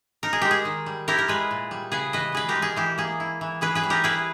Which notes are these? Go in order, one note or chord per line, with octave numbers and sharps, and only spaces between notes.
D#4 A#4
G#4
G#3 G4
G#4
D#3
G3
E4 G4 A#4
A#4
G#3 G#4 B4
A#2
G3
C#3 G#4 B4
E3 B4 D#5
B2 G#4 B4
G4 A#4
G#3
G#4
E3 G4
A#3 G#4
E4
E3
E3 G#4 B4
G#4 B4
G3
G4 A#4
E4 G#4 B4